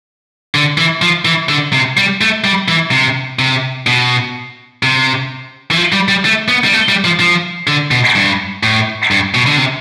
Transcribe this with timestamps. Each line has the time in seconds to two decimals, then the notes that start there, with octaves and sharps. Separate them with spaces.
0.55 D3
0.78 E3
1.02 F3
1.25 E3
1.49 D3
1.73 C3
1.97 G3
2.21 A3
2.44 G3
2.68 E3
2.91 C3
3.39 C3
3.87 B2
4.83 C3
5.71 E3
5.77 F3
5.93 G3
6.08 G3
6.25 A3
6.48 B3
6.65 G3
6.73 A3
6.89 G3
7.05 F3
7.20 F3
7.68 D3
7.91 B2
8.15 G2
8.63 A2
9.11 G2
9.35 B2
9.47 D3
9.58 C3